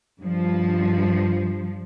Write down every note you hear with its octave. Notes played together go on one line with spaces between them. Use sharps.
G2 F3